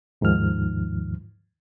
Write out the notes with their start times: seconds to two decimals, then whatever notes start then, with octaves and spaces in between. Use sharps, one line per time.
0.21 D#2 G#2 D#3 F3 F6